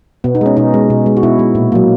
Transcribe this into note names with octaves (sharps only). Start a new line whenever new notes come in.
B2 B3
D#4
G#3 C#4
B2 D#4
G#3
B2
G#3
F#4
B2 E4
G#3
A#2
F#3 A#3